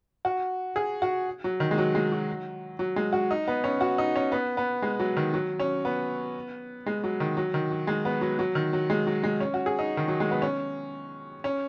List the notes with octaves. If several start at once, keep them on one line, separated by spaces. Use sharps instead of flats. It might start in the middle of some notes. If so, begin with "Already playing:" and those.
F#4
G#4
F#4
F#3
D#3
G#3
F#3
G#3
F#3
F#3
G#3
F#4
D#4
B3
C#4
F#4
D#4
C#4
B3
B3
G#3
F#3
D#3
F#3
C#4
B3
G#3
F#3
D#3
F#3
D#3
F#3
G#3
B3
F#3
F#3
D#3
F#3
G#3
F#3
G#3
C#4
F#4
G#4
D#4
D#3
F#3
G#3
B3
C#4
C#4